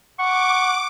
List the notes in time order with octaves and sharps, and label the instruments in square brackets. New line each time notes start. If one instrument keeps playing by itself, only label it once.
[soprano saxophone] F#5 [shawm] C#6 [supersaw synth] D6